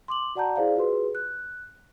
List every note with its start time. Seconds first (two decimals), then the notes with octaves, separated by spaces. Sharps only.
0.08 C6 D6 F#7
0.35 F#4 D5 F#5 A5 A#5 G6
0.56 E4 G#4 C5 D5 F5
0.76 F4 F#4 G#4 B4 C6
1.15 F#6